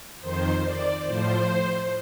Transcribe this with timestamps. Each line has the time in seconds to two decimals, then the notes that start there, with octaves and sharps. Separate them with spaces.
0.21 F2 D#3 C5
0.63 D5
1.05 A2 F3 C5